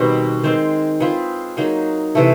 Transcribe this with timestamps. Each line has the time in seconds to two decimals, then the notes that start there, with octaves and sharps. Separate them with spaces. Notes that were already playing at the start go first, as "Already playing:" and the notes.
Already playing: B2 D#3 G3 C4
0.43 D#3 G#3 C4
1.00 C4 F4 G#4 B4
1.57 F#3 A#3 D#4 G#4
2.15 C3 E3 A3